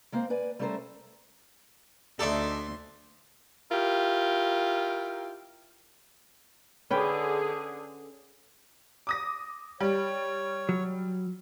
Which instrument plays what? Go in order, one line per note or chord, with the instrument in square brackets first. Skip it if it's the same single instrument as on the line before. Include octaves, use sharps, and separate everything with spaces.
[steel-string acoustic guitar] G#3 A#3 C4 C5
B4 D5 G#5
G3 A3 C#4 A4 A#4 C5
[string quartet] D2 C6 [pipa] A3 D#4 [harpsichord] A4 D5 E5
[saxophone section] E4 F4 G4 A#4
[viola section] D3 G#4 [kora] C#4 B4 G5
[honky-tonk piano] D6 D#6 A#6
[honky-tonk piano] G3 [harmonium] C#5
[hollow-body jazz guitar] F#3